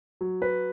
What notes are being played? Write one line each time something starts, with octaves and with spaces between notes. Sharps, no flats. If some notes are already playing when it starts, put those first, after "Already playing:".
F#3
B4